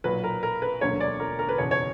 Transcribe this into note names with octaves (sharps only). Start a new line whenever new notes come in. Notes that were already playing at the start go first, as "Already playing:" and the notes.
B1 A#2 F#3 B4
A#4
A#4
B4
E1 D2 D3 F#3 A#3 C#5
D5
A#4
A#4
B4
F#1 E2 B2 C#5
C#5